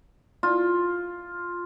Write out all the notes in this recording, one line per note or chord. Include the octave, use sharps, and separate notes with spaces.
F4